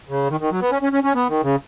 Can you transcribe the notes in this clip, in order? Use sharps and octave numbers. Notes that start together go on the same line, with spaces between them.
C#3
D#3
D#3
F#3
B3
C#4
C#4
C#4
C#4
B3
D#3
C#3